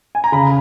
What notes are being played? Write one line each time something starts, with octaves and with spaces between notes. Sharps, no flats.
G#5
A#5
C#3 B5